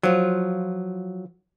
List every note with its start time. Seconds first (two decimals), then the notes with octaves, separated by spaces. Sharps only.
0.03 F3 F#3 F4